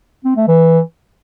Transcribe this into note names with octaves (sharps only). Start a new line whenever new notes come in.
C4
A3
E3